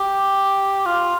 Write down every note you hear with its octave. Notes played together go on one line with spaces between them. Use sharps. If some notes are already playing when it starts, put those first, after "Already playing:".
Already playing: G4
F4